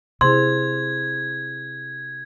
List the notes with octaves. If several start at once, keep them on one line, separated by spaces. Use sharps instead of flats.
C3 E4 G#4 C5 C6 G#6